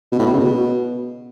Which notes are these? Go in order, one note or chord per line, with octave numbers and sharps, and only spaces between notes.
B2
A2
B2
C#3
B2